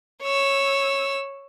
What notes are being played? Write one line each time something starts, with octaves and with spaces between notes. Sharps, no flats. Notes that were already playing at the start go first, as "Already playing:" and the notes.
C#5 E6